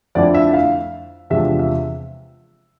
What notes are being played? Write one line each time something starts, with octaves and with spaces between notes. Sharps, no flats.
F2 D3 F3 A3 E4 D5
E5
F5
E2 C3 F3 G#3 D4 E5
E5